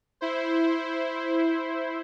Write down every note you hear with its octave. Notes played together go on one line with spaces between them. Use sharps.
E4 C5